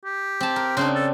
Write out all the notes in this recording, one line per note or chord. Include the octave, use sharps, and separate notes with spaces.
G4
C4 A5
A#4
C#3 C4 D4 C5
A4